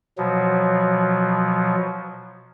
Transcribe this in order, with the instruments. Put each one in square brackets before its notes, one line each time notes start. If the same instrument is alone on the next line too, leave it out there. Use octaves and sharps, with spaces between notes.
[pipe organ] B2 F3 F#3